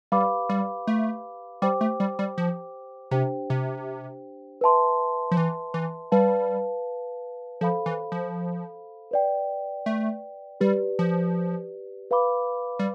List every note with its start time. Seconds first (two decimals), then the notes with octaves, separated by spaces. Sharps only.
0.12 G3 G4 B4 F5 B5 D6
0.49 G3
0.87 A3
1.62 G3 G4 C5 G5 D6
1.81 A3
2.00 G3
2.19 G3
2.38 F3
3.11 C3 D4 G4 C5 G5
3.50 C3
4.61 B4 E5 A5 C6
5.31 F3
5.37 E3
5.74 E3
6.12 G3 B4 F5 A5
7.61 F3 A4 C5 F5 B5
7.86 E3
8.12 F3
9.11 B4 D5 G5
9.86 A3
10.61 G3 G4 B4 D5
10.99 F3
12.11 B4 F5 B5 D6
12.79 G3